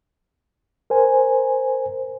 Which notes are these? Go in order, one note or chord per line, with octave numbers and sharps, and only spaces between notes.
A#4 C5 G#5